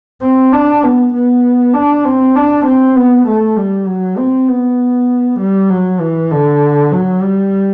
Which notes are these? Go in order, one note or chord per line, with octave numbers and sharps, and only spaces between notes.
C4
D4
B3
B3
D4
C4
D4
C4
B3
A3
G3
F#3
C4
B3
G3
F#3
E3
D3
F#3
G3